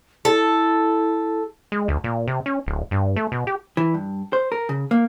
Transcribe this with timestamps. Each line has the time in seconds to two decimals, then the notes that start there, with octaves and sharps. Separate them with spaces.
0.25 E4 A4
1.72 G#3
1.88 D2
2.04 A#2
2.27 C3
2.46 C#4
2.66 D1
2.91 G2
3.16 A3
3.32 B2
3.47 G4
3.77 E3
3.94 G2
4.33 C5
4.52 A#4
4.69 C#3
4.91 A#3